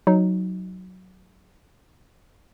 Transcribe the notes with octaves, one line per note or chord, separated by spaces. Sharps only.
F#3 D#4